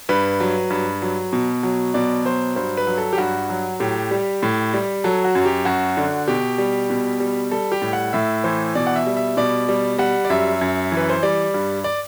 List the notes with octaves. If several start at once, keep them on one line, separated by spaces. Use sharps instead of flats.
G2 B4
F#3
G2
F#3
B2
F#3
B2 D5
F#3 C5
G2 C5
B4
F#3
A4
G4
G2 F#4
F#3
A2 G4
G3
A2
G3
F#3 A4
F#4
F#2
G4
F#2 F#4
D3
B2 G4
G3
B2
G3
G3 A4
G4
A2
F#5
A2 E5
E3 C5
B2 D5
F#5
E5
G3
E5
B2 D5
G3
G3 F#5
D5
F#2 E5
F#2
E3
B4
C5
G3 D5
G2
D5